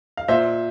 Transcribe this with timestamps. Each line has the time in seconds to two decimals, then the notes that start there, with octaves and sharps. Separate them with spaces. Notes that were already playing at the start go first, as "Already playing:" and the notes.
0.17 F5
0.28 A#2 C5 E5